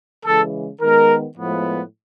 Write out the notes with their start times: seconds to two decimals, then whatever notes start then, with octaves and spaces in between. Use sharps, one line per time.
0.24 C#3 E3 G#3 A4
0.80 D#3 G#3 B3 A#4
1.37 A2 F3 G#3 B3